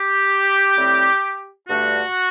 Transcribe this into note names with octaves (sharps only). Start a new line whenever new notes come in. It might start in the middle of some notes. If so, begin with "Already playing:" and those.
Already playing: G4
A2 G3 C4
G2 D3 A3 F#4